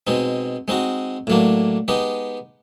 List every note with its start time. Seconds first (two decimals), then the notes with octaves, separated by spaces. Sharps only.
0.07 B2 G#3 C4 D#4
0.68 G#3 C4 D#4 F#4
1.27 A2 F#3 A#3 D4
1.88 G#3 B3 D#4 G4